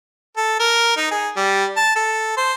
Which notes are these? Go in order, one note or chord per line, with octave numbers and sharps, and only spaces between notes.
A4
A#4
D#4
G#4
G3
A5
A4
C5